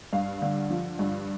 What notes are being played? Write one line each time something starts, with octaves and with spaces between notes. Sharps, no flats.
G2 F5
D3
F3
G2